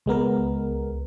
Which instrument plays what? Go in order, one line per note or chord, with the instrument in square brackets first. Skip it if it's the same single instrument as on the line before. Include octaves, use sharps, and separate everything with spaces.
[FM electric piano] C#2 G#3 B3 A#4